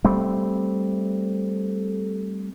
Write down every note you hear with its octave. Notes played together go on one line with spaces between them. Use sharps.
G3 A3 C4